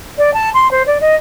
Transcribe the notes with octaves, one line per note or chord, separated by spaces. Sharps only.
D5
A5
C6
C5
D5
D#5